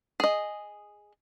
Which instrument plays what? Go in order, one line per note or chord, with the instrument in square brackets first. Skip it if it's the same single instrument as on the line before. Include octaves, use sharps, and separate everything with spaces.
[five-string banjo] G#4 D#5